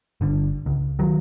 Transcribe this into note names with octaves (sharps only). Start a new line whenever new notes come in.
G1 D3
C#2
D#3 F#3